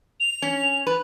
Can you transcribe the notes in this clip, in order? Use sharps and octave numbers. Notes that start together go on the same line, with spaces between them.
F7
C#4
B4